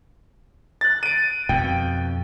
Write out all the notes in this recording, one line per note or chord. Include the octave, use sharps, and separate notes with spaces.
F#6 A6
D7 D#7
F2 B2 G5